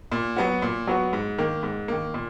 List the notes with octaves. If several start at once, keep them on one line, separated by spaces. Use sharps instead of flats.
A#2
F#3 B3 F#4
A#2
F#3 B3 F#4
G#2
D#3 A#3
G#2
D#3 A#3
A#2